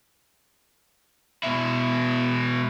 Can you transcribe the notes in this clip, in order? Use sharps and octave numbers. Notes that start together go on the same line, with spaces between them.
B2 E4